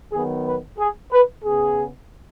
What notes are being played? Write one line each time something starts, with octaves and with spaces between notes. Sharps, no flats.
D#3 F#3 B3 G#4
B4
G#4
B4
C#3 B3 G#4